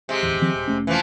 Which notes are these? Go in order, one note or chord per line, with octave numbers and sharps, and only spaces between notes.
C3 G#3
D1 E2
D#3 F3 C4
D#1
F1 A3 C#4
E3 F3